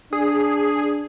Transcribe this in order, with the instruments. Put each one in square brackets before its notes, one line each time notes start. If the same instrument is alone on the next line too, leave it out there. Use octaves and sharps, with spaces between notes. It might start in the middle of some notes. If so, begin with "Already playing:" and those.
[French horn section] D4 [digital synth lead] G#4